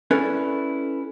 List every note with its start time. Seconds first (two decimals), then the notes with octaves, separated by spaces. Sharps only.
0.11 C#4 E4 A4 B4 D5